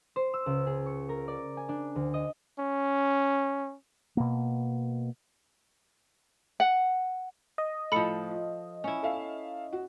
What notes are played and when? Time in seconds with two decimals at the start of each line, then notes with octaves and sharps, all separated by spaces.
0.16 C5
0.34 E6
0.46 C#2
0.66 G#4
0.86 C#6
1.09 A#4
1.28 D5
1.57 G#5
1.69 D4
1.95 D2
2.14 D#5
2.59 C#4
4.17 B2 A#3
6.60 F#5
7.58 D#5
7.92 A2 F3 A4 B5 C#7
8.31 F4
8.84 C#4 E4
9.03 A4 E5 F5
9.73 F#4